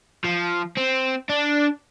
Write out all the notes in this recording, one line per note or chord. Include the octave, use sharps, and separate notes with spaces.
F3
C4
D4